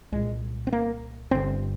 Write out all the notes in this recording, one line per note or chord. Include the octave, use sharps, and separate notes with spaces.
C2 A#2 G#3
C4
A#3
G1 G2 D3 C4